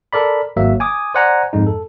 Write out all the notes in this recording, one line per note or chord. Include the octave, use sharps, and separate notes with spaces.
A4 A#4 D5 B5
G#1 F#3 A#3 E5
G#5 D6 D#6
C5 D5 F#5 G#5 A#5
F2 G#2 G#3 D#4
A4